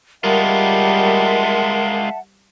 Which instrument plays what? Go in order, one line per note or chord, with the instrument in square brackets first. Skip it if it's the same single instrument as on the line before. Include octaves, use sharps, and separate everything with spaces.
[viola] G3 [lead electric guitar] G#3 F4 [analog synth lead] A#4 [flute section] E5 F#5 A5